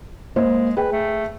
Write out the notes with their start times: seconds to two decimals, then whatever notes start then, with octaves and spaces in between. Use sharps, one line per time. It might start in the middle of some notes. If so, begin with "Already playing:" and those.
0.36 G#3 A#3 C5
0.77 G#4 B4 G5
0.92 A3